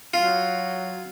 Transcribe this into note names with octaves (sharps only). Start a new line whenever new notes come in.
F#3 F4